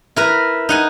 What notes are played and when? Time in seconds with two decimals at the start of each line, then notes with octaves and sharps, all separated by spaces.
0.16 E4 A#4 B4
0.69 D#4 F#5 G#5